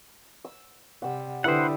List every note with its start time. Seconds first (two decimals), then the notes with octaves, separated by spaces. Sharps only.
0.45 E6
1.02 C3 G3 F#5 E6
1.44 D3 G3 E4 B4 C5 F#5 D#6